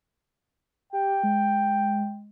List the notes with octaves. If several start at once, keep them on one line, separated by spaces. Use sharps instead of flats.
G4 G5
G#3